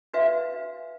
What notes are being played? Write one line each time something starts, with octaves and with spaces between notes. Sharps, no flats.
D4 F#4 B4 E5 F5